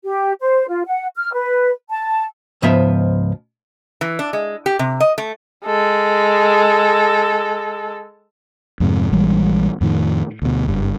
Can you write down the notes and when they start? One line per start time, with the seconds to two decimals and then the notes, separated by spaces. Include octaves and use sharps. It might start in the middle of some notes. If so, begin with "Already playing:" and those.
0.04 G4
0.41 C5
0.68 F4
0.86 F#5
1.16 F6
1.33 B4
1.90 A5
2.62 C#2 G#2 F3 B3 C5 E5
4.01 E3
4.19 D4
4.33 G#3
4.66 G4
4.79 C3
5.00 D#5
5.18 A3
5.65 G#3 A4
8.80 F2 G#2 C3
9.12 A#1 E3 G3 G#3
9.81 F2 A2 D#3
10.42 D2 B2
10.68 F#1 G2